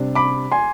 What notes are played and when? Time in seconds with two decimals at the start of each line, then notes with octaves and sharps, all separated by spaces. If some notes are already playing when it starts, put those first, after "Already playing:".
Already playing: C3 G3 D4
0.15 B5 D6
0.52 G#5 C6